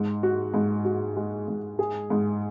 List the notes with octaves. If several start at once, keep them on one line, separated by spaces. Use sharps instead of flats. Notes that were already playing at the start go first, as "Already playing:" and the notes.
Already playing: G#2
F#4
G#2
F#4
G#3
G#2
G#4
G#2